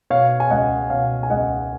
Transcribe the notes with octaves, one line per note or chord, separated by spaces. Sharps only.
B2 C#5 F5
G#5
C#2 D#5 F#5
B2 C#5 F5
G#5
C#2 D#5 F#5